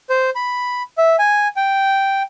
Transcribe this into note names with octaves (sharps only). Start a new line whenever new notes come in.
C5
B5
E5
G#5
G5